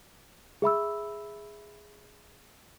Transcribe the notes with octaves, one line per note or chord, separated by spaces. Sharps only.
G#4 E5 B5 E6